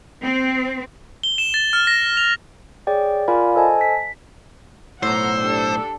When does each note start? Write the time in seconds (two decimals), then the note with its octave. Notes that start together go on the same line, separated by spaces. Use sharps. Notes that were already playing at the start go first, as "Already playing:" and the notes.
0.23 C4
1.23 G7
1.38 E7
1.54 A6
1.73 F6
1.87 A#6
2.17 F7
2.87 G#4 C#5 D5 G5
3.28 F4 A#4 D5 F5 G#5 B5
3.56 A4 C5 D#5 G#5 A5
3.81 B6
5.03 B1 A2 C5 F#5 A#5 C6 E6
5.38 D4 G4 A4